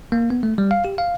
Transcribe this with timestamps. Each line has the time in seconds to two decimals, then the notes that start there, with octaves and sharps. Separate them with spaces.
0.12 A#3
0.30 B3
0.43 A3
0.58 G3
0.71 F5
0.85 G4
0.98 F5